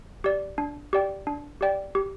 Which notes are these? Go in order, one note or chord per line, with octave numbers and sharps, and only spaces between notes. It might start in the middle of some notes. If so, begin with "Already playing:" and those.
G4 D5
D4
G4 D5 G5
D4
G4 D5 G5
G4